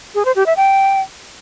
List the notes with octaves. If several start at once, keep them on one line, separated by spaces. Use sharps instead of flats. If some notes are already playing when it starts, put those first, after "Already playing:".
G#4
C5
G4
E5
G5